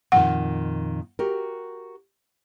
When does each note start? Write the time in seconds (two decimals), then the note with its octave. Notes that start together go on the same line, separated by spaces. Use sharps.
0.12 F2 A#2 D#3 F#5
1.19 F#4 G4 A#4